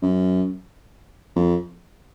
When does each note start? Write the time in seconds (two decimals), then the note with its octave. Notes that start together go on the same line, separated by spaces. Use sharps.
0.02 F#2
1.36 F2